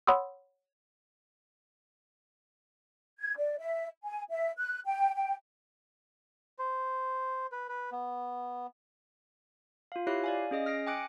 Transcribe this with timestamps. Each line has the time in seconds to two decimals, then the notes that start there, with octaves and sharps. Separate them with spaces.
0.07 C#5 F#5 B5 C6 D#6 E6
3.19 G#6
3.36 D5
3.59 E5
4.04 G#5
4.30 E5
4.58 F#6
4.85 G5
5.14 G5
6.59 C5
7.52 B4
7.68 B4
7.92 B3
9.92 F4 F5
10.07 E4 G4 C#5 E5 F#6 C7
10.24 D5 F5 G#5
10.51 C#4 G#4 D#5 D#6
10.66 F6 A#6 C7 D7
10.87 G5 G#5 D6 F#6 C#7 D7